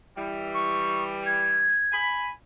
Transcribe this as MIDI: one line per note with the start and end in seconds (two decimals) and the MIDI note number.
0.17 1.72 52
0.17 1.72 55
0.54 1.04 85
1.26 2.00 92
1.92 2.31 80
1.92 2.31 83